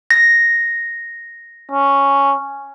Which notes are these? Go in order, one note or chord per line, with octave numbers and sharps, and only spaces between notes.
A#6
C#4